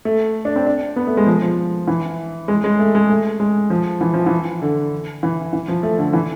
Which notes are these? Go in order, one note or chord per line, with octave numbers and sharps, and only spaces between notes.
A3
D4
C4
D4
B3
A3
G#3
F3
F3
E3
G#3
G#3
A3
G#3
A3
G#3
F3
E3
F3
E3
D3
E3
E3
F3
A3
D3
E3